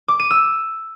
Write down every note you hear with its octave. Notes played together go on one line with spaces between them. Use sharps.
D6
D#7
E6